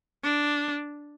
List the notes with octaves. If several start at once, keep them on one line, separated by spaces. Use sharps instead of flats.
D4